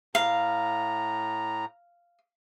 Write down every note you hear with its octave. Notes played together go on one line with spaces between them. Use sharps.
A2 F5 A#5